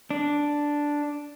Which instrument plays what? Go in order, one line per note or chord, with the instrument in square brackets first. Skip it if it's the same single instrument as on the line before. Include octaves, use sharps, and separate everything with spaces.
[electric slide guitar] D4